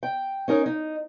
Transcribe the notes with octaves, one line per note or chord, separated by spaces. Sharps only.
G5
C#4 D#4 A#4 C#5
D#4